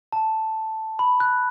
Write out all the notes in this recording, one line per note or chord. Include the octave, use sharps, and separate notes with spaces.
A5
B5
F#6